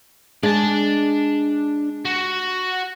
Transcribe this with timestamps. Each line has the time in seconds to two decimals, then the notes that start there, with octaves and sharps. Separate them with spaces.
0.43 G#3 D4 A5
2.05 F#4